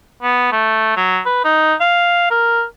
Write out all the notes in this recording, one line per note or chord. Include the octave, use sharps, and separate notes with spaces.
B3
A3
F#3
B4
D#4
F5
A#4